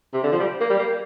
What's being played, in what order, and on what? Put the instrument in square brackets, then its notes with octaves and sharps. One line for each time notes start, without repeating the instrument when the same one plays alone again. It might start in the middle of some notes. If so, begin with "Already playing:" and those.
[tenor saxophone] C3
D3
F3
G3
A#3
G3
A#3